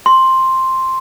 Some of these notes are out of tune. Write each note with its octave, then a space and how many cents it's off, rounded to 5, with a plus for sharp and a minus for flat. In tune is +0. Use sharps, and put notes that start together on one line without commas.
C6 +5